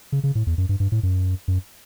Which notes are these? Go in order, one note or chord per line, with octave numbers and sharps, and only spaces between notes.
C#3
C#3
A2
E2
F#2
G2
G2
A2
F#2
F#2